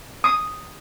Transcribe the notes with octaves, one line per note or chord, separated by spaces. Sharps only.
D#6